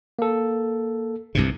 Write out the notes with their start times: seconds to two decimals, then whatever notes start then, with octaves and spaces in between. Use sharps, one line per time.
0.19 A#3 A4
1.35 C2 G2 C3